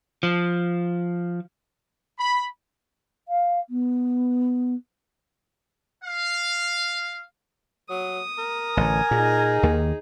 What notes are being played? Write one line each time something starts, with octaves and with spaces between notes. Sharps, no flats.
F3
B5
F5
B3
F5
F#3 D#6
A#4
A1 D3 G#5
A#2 D#4 G#4
D#2 D#3 A#3